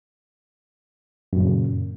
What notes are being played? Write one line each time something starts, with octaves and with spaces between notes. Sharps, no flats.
F#2 A#2 C#3